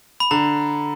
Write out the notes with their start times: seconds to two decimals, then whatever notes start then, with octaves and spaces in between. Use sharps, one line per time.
0.20 B5
0.31 D3 A#5